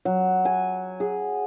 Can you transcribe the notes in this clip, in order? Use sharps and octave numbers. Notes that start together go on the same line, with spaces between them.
F#3
G#5
G#4